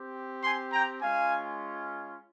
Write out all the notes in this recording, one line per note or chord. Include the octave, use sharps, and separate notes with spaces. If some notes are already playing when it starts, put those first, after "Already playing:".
Already playing: C4 G4
G#5 C6
G5 A#5
G#3 C#4 F4 F5 G#5